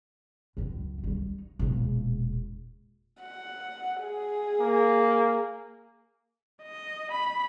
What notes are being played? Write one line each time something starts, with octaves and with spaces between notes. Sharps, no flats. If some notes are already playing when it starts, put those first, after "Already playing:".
C#2 F#2
G3 D#4
E1 A#1
F#5
G#4
A#3
D#5
B5